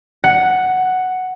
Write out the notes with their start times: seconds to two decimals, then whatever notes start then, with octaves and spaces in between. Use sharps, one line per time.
0.24 F#5